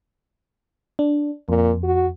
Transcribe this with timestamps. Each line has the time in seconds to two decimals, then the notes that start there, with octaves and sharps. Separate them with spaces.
0.99 D4
1.49 F2 A#2
1.84 F#4